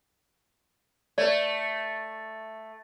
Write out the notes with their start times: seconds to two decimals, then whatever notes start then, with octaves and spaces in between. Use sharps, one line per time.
1.18 A3 B4 D5